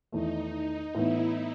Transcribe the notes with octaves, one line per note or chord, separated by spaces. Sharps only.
E2 D#3 A3 D#4
A2 E3 B3 E4